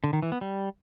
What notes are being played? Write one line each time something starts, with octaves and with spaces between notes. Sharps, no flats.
D3
D#3
E3
B3
G3